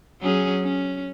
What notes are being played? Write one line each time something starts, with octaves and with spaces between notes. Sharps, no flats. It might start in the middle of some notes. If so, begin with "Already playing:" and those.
F#3 C#4 G#4
C#4